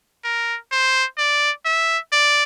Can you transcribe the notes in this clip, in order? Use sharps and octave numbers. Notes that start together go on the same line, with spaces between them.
A#4
C5
D5
E5
D5